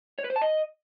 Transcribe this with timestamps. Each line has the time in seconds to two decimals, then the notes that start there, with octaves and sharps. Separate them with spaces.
0.19 C#5
0.24 B4
0.30 C5
0.36 A5
0.42 D#5